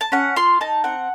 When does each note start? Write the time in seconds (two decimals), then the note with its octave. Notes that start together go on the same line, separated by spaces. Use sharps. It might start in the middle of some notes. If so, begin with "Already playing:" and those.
0.01 A5
0.12 C#4 F#5
0.36 F4 C6
0.61 D#4 A5
0.84 C4 F#5